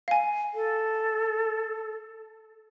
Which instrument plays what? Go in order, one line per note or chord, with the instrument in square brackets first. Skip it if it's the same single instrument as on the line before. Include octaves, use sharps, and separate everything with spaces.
[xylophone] F5 G#5
[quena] A4